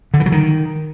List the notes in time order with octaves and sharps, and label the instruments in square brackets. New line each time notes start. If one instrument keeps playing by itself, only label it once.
[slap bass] D3
E3
F#3
D#3